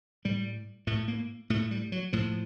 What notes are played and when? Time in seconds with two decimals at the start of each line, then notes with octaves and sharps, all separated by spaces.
0.25 A2 G3
0.87 A2 A3
1.08 A#3
1.50 A2 A3
1.71 G3
1.92 F#3
2.13 A2 F3